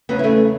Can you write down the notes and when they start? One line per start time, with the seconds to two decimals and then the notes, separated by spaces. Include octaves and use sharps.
0.09 E2 C#3 F#3 B3
0.19 E4
0.24 A3 C#4